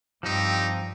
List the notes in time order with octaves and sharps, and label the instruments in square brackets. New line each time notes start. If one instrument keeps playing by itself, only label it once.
[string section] G2 [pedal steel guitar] F3 C4 [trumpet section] D#4 G4